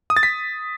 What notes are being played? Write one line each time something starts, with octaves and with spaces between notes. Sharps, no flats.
D#6
A6
B6